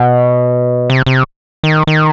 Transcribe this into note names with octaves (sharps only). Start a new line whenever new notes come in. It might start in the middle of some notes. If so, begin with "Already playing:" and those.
Already playing: B2
C3
C3
D#3
D#3